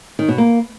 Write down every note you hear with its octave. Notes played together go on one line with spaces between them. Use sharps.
D#3
B2
A#3